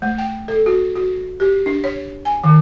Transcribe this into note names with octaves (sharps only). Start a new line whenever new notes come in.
A3
G5
A4
F#4
F#4
G4
D4
C#5
G#5
D#3